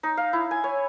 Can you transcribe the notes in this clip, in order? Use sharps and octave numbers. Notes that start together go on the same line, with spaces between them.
D#4
F5
E4
G#5
C#5